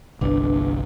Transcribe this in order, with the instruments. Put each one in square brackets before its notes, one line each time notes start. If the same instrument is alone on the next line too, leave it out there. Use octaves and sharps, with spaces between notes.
[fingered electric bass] G1 C2 [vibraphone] D4 B4